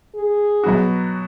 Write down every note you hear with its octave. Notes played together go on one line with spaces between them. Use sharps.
G#4
B2 F#3 B3 F#4